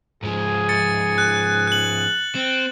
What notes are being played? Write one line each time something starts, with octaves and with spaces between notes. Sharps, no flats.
G#2 F3 G#4
A6 C#7
F#6
F#6 F#7
C4